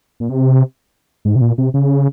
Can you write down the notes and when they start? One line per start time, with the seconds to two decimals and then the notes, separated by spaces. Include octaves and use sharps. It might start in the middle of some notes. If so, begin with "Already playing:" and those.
0.20 A#2
0.29 C3
1.25 G#2
1.36 C3
1.41 A#2
1.58 C3
1.74 C#3